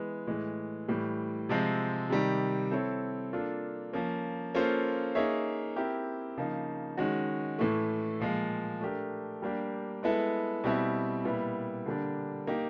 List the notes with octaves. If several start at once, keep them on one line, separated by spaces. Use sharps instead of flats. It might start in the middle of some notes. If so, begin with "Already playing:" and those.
Already playing: E3 G#3 B3
A2 E3 G#3
A2 E3 G3
C3 F3 G#3 C4
C3 D#3 G3
C4 E4 A4 C#5
A#3 D4 F4 A4
F3 A#3 C#4
A#3 C#4 F4 A4 C5
A#3 D#4 G#4 C#5 E5
C4 E4 G4 A#4
C#3 F3 A#3 D#4
D#3 G#3 C#4 F#4
A2 E3 A3
A#2 F3 G#3
A3 D4 G4 A#4
G3 A#3 D4 G4
G#3 B3 E4 A4
B2 G3 C4 E4
A#2 G3 B3 E4
D3 G3 A#3 D4
A#3 D#4 G4